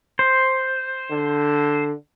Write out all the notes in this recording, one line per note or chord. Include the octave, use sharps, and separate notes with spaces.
C5
D3